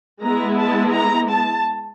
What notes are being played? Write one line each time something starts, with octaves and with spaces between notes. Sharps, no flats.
G#3 B3 E4 A#5
A5
A#5
A5